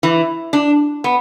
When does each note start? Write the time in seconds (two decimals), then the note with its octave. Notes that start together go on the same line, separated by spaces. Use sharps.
0.03 E3
0.53 D4
1.04 B3